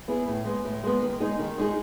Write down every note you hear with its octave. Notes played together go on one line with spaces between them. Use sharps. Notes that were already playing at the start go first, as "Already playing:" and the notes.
B3 E4 G#4
A2
G#3 B3
A2
G#3 B3
D#3
G#3 D#4 G#4
D#3
G#3 D#4 G#4